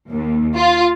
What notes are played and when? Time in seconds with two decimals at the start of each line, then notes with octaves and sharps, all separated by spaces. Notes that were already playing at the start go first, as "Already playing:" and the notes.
0.10 D#2
0.56 F4